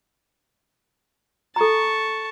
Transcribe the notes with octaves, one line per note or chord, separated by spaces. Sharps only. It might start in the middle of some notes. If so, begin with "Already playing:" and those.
A4 A5 A#5 C#6